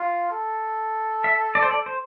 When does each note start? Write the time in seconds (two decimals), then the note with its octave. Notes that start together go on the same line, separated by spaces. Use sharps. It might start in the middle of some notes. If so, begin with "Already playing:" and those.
Already playing: F4
0.31 A4
1.24 E5
1.55 D5
1.62 C5
1.71 D5
1.86 C5